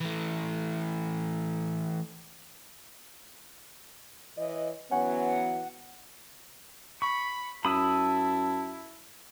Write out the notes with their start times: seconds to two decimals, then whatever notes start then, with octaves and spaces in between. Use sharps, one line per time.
0.01 E3 A3
4.38 E3 C#5 D#5
4.91 E3 F#3 B3 C#4 F#5
7.02 B5 C#6
7.65 F#2 E4 A5 B5 D#6 E6